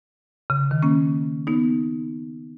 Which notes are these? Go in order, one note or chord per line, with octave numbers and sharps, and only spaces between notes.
C#3
D#3
A#3 C#4
B3 D#4